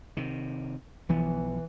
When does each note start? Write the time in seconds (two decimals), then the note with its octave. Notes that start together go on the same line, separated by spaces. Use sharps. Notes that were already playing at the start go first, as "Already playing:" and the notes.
0.17 C3 D#3
1.09 B1 E3 F3 B3